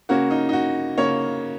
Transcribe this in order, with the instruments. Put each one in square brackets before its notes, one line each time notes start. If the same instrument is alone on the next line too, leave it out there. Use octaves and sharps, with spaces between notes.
[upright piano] C#3 A#3 C#4 F#4
D#4
D#4
F#4
C#3 A#3 C#4 C#5